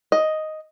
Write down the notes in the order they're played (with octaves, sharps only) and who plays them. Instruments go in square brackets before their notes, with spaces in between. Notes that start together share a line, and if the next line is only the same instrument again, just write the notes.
[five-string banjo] D#5